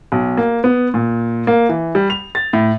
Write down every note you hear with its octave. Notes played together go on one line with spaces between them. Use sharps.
B1
A#3
B3
A#2
A#3
E3
G3
F7
A6
A2